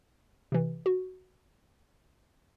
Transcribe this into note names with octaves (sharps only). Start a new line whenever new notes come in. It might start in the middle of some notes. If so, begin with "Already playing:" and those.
C3 E3
F#4